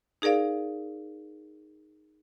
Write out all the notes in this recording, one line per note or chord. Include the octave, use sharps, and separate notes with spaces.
D#4 G#4 A#4 D5 F5